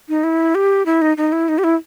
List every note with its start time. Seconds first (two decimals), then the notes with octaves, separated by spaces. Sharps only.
0.09 D#4
0.24 E4
0.55 G4
0.86 E4
1.02 D#4
1.17 D#4
1.32 E4
1.48 D#4
1.58 G4
1.64 E4